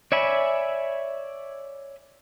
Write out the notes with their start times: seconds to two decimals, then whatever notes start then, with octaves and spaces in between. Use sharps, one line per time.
0.12 C#5 D5 E5 G#5 B5